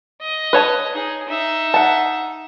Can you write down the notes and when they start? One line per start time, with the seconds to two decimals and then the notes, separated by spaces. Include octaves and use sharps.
0.22 D#5
0.53 B4 C#5 A5
0.93 D#4 G#4
1.28 D#4 E5
1.74 F#5 A5